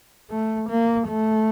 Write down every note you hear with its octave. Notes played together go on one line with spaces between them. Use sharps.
A3
A#3
A3